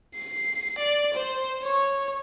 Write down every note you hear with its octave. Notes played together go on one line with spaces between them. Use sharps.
C7
D5
C5
C#5